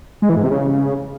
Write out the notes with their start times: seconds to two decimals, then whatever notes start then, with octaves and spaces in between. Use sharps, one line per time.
0.22 G#3
0.29 E3
0.36 G#2
0.44 C3
0.51 C#3